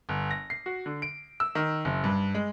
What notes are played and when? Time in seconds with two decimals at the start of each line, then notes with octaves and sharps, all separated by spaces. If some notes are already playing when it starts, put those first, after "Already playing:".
0.09 G1
0.31 A#6
0.50 C7
0.66 F#4
0.86 D3
1.02 D7
1.40 E6
1.55 D#3
1.85 F#1
2.04 G2
2.35 G#3